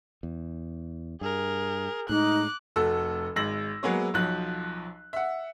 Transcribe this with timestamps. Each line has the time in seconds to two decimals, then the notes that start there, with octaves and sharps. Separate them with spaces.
0.23 E2
1.21 G2 G#4 A#4
2.09 A2 G#3 D#4 D6 F#6
2.76 F1 A3 F#4 A4 E6
3.36 G#1 G#3 E6 A#6 F#7
3.83 F#3 G#3 A#3 B3 G#4 C#5
4.14 B1 F3 F#3 F#6
5.13 E5 F#5